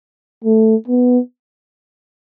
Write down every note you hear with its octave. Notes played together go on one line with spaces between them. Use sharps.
A3
B3